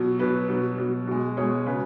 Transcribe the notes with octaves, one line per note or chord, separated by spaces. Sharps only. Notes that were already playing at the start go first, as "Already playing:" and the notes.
Already playing: B2 F#3
B2 F#3 B4
B2 F#3
B2 F#3
B2 G#3
B2 G#3 G#4 C#5
C#3 B4